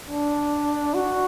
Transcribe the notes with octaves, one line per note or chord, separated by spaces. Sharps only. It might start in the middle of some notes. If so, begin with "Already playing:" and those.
D4
F#4